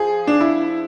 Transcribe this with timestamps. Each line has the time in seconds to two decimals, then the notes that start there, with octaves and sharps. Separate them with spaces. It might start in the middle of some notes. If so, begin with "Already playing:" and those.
Already playing: F3 G#4
0.27 D4
0.41 E4